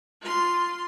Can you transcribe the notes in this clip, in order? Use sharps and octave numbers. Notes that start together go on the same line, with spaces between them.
F4 C6